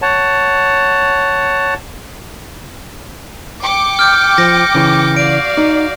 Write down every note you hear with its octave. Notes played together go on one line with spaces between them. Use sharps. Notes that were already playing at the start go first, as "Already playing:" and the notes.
C#5 F#5 A5
G5 D6 C#7
F6 G6
F3 A#6
C#3 E3
F#4 D5 F5 D7
D#4